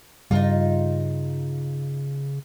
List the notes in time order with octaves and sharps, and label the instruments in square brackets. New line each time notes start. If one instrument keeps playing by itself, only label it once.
[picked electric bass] G2 G3 [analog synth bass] C#3 [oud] D#4 F4